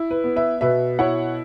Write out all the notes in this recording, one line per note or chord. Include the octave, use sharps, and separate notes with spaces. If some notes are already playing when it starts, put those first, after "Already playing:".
Already playing: E4
B4
B3
B4 E5
B2 B4 E5
E4 C#5 F#5